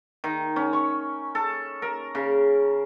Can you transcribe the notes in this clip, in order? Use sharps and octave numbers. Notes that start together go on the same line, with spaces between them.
D#3
C#4
C#6
A4
A#4
C#3